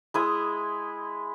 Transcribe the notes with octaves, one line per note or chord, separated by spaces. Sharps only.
G#3 E4 D#6